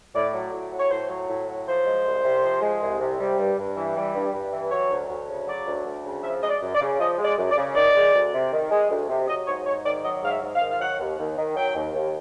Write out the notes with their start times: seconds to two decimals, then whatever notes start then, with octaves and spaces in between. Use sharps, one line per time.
0.15 A2 D5
0.34 F#3
0.53 A2
0.73 F#3
0.80 C#5
0.91 A2 C5
1.10 F#3
1.30 A2
1.48 F#3
1.67 F3 C5
1.86 G#3
2.06 C2
2.24 C3
2.44 F3
2.62 G#3
2.82 C2
3.00 C3
3.19 G3
3.39 G2
3.58 G2
3.76 E3
3.96 G3
4.15 G2
4.34 G2
4.52 E3
4.71 F#3 C#5
4.91 D2
5.09 D2
5.29 C#3
5.47 F#3 D5
5.66 D2
5.85 D2
6.05 C#3
6.23 F3 E5
6.43 G#3 D#5
6.49 D5
6.62 F#2
6.75 D5
6.81 C#3
6.99 F3 D#5
7.18 G#3
7.25 D5
7.38 F#2
7.51 D5
7.57 C#3
7.75 D#3 D5
7.96 G#3
8.14 D2
8.34 C3
8.53 D#3
8.71 G#3
8.90 D2
9.09 C3
9.28 F#3 D#5
9.47 G#2 C#5
9.66 G#2 C#5
9.85 D#3 D5
10.04 F#3 D#5
10.23 G#2 F5
10.30 E5
10.42 G#2
10.55 F5
10.61 D#3
10.71 F5
10.80 F#3 F#5
10.99 D#2
11.18 D#2
11.37 D#3
11.56 F#3 G5
11.76 D#2
11.94 D#2